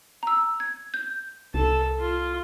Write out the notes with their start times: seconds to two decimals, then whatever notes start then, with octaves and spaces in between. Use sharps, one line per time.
0.23 A#5 E6
0.60 G#6
0.94 G6
1.54 C2 A4 A5
2.00 F4